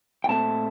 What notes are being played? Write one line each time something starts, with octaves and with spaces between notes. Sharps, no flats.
G5
A#2 A3 C4 A5